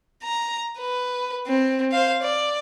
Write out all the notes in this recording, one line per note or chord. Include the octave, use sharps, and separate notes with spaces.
A#5
B4
C4
C5 F5
D5